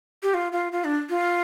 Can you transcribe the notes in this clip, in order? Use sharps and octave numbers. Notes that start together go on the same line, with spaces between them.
G4
F4
F4
F4
D4
F4